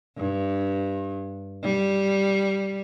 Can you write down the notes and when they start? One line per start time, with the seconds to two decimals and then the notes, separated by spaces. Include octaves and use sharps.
0.17 G2
1.64 G3